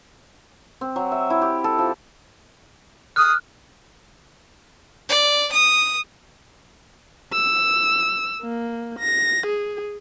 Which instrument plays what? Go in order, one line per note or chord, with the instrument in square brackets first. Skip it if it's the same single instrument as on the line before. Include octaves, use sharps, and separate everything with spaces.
[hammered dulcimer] C4
F#3
E5
E4
G4
A4
F3
[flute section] D#6 [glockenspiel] F6 F#6
[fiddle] D5
D#6
[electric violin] E6
A#3
A#6
G#4